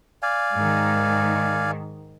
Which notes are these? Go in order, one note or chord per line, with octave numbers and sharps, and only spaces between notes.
D5 F5 G#5
G#2 D#3